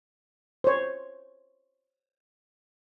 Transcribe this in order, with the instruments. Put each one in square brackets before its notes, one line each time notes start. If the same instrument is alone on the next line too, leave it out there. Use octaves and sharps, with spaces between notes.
[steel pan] C5 C#5